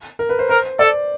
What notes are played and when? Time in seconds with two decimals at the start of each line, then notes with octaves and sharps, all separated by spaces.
0.19 A#4
0.29 B4
0.39 C5
0.49 A#4 C5
0.79 A4 D5